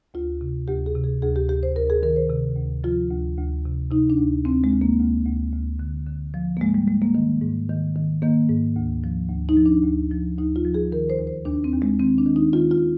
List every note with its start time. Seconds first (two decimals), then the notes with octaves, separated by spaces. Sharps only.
0.14 D2 F4
0.41 C3
0.68 D2 G4
0.86 G#4
0.95 C3
1.04 G#4
1.22 D2 G#4
1.36 G4
1.49 D2 G4
1.63 C5
1.76 D2 A#4
1.90 G#4
2.03 D#3 A#4
2.16 C5
2.29 C3
2.57 D2
2.84 F3 F4
3.11 D2
3.37 D2
3.65 C3
3.91 C3 D#4
4.10 D4
4.18 D2
4.45 D2 C4
4.64 G#3
4.73 D2
4.81 A#3
5.00 D2
5.26 D2
5.54 D2
5.79 D3
6.07 D3
6.34 F3
6.57 A#3
6.61 G#2 G#3
6.74 G3
6.88 G#2 G#3
7.02 A#3
7.15 D#3
7.41 G#2
7.69 D#3
7.95 D#3
8.22 D#3 A#3
8.49 G#2
8.76 D2
9.04 F3
9.30 D2
9.49 D#4
9.57 F3
9.66 D4
9.84 D2
10.11 F3
10.37 D2 D#4
10.56 F4
10.65 F3
10.74 G#4
10.92 D#3 A#4
11.10 C5
11.19 D#2
11.27 C5
11.45 D#2 D4
11.64 C4
11.73 D#2
11.82 G#3
12.00 D#3 C4
12.18 D4
12.26 D#3
12.36 D#4
12.53 D#3 F4
12.71 F4